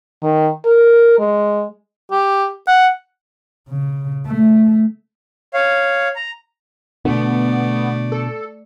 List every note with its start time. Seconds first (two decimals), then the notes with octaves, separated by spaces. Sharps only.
0.23 D#3
0.66 A#4
1.19 G#3
2.11 G4
2.67 F#5
3.70 C#3
4.26 A3
5.54 C#5 F5
6.16 A#5
7.05 B2 D3 A3 B3 D5
8.12 A4